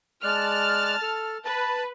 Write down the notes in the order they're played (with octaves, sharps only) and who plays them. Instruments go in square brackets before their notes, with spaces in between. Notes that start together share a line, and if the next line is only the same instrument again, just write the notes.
[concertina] G#3 D5 F#6 [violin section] A5 F6
[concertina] A4
[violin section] B4 [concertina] A5